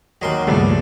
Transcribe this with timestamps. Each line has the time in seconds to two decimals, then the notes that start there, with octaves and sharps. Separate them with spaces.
0.22 D#2 F#3 A#4 D#5 C6
0.47 C#2 G2 A#2 F3 G3 A3 B3 D5